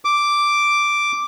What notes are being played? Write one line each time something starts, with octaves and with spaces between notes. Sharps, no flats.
D6